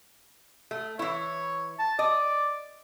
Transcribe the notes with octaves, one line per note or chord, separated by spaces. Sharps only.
A3
E3 E4 C#5
A5
D5 D#5